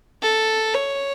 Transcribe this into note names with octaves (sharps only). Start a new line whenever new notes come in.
A4
C#5